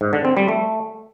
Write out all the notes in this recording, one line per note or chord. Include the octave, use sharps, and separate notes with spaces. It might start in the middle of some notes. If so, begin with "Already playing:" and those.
G#2
D3
C4
G3
A3